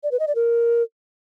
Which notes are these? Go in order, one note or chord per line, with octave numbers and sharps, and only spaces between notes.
D5
B4
D#5
D5
A#4